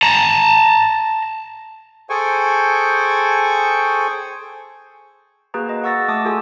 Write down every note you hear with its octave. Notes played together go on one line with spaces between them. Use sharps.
A5 A#5
G#4 A4 C5 G5 G#5 C#6
A#3 F#4 G#4 B4 A#5
D#5
F#5 C#6 E6 A6 A#6
A3 A5 D6 D#6
F4 F#4 G#4 A4 G#5 E6